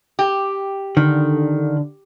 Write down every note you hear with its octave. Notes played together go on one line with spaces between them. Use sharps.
G4
D3 D#3